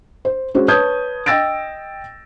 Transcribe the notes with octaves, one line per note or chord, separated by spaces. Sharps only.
C5
G#3 C#4 F#4 C5
B4 C#5 A5 D#6 G6 G#6
D#5 G5 E6 A6 A#6 D7